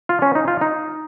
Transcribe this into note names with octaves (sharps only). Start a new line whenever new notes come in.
F4
C#4
D#4
F4
D#4